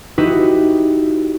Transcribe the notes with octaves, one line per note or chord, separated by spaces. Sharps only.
D#4 E4 F#4 G4 B4